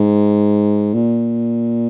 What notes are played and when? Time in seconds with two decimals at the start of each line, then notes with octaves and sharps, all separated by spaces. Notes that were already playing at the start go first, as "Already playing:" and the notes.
Already playing: G#2
0.94 A#2